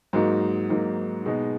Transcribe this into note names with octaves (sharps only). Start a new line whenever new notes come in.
G#2 F#3 A#3 D#4 F#4
G#2 F#3 A#3 D#4 F#4
B2 G#3 D#4